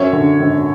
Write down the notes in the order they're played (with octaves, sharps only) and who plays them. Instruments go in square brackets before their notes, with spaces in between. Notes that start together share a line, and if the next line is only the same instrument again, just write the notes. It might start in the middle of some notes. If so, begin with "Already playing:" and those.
Already playing: [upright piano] F#2 C#5 E5
D3
G#1